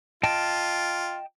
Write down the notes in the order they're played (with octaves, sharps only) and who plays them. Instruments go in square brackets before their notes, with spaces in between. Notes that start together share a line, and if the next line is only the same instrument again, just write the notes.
[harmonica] F4 [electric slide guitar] D#5 G5 A5